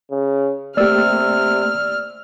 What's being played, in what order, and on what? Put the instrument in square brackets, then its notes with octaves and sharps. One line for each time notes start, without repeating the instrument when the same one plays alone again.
[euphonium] C#3
[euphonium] C3 [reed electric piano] A3 A#3 G4 [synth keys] D5 E6 [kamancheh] F6